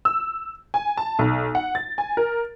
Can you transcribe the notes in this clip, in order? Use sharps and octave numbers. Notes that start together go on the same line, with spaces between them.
E6
G#5
A5
B1
F#5
A6
G#5
A#4